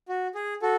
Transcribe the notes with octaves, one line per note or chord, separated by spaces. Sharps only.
F#4
G#4
F#4 A4